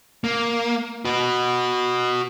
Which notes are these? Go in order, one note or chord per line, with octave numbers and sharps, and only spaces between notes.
A#3
F#4 B4